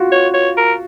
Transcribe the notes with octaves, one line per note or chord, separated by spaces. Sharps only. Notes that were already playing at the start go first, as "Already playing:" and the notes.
Already playing: F4 F#4
C#5
C#5
A#4